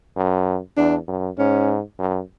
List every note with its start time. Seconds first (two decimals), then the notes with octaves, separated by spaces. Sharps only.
0.16 F#2
0.77 E2 D4
1.08 F#2
1.38 G#2 C#4
1.99 F#2